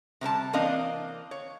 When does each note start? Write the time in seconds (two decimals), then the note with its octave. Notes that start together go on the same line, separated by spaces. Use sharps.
0.21 C3 G3 C5 A5
0.53 E3 A#3 C4 D4 D#5 F5
1.31 C#5